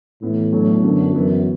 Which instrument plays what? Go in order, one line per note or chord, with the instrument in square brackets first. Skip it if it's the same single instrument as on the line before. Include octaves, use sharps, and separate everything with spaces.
[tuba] A2 [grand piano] E3 B3 E4
[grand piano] B2 F#3 A3 D4
[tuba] F#2 [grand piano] D3 F#3 B3 D4
[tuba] F#2 [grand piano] E3 B3 E4